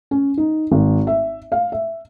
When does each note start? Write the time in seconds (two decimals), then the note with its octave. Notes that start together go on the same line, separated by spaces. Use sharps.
0.11 C#4
0.37 D#4
0.72 G#1
1.07 E5
1.52 F5
1.72 E5